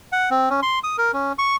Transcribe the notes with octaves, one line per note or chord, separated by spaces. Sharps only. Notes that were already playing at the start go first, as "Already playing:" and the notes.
F#5
C4
C#4
C6
D#6
A#4
C#4
C#6